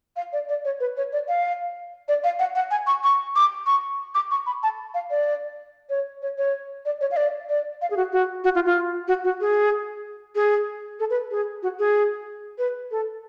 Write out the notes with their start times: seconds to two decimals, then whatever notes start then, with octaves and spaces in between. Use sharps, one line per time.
0.16 F5
0.33 D5
0.49 D5
0.65 C#5
0.80 B4
0.97 C#5
1.12 D5
1.28 F5
2.08 D5
2.24 F5
2.39 F#5
2.55 F#5
2.71 G#5
2.87 C#6
3.03 C#6
3.36 D6
3.66 C#6
4.15 D6
4.31 C#6
4.46 B5
4.63 A5
4.94 F5
5.10 D5
5.89 C#5
6.22 C#5
6.38 C#5
6.85 D5
7.01 C#5
7.11 F5
7.16 D5
7.49 D5
7.81 F5
7.90 G#4
7.97 F#4
8.12 F#4
8.44 F#4
8.55 F4
8.65 F4
9.08 F#4
9.24 F#4
9.41 G#4
10.35 G#4
10.99 A4
11.10 B4
11.31 G#4
11.63 F#4
11.79 G#4
12.58 B4
12.91 A4